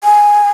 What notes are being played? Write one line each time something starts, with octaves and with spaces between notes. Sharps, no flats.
G#5